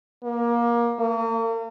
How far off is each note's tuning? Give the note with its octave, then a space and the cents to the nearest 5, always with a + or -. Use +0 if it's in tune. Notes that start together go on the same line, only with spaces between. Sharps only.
A#3 +20
A#3 -40